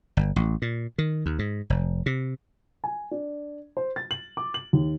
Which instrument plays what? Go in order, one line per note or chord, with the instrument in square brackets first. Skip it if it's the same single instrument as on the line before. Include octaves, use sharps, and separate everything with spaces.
[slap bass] G1
A1
A#2
D#3
D#2
G#2
F1
C3
[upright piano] G#5
D4
C5
A6
F#7
D6
F#7
D#2